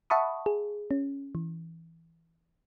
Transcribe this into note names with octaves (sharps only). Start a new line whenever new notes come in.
E5 F#5 A5 B5 C#6 D#6
G#4
C#4
E3